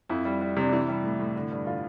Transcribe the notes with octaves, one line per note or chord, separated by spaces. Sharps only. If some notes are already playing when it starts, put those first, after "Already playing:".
F2 E4
G3
G3
C3 D4
E3 E4
G3
A2
A2
D3
G2
D3 F4